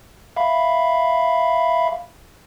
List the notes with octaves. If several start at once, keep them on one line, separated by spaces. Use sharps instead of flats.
E5 F5 B5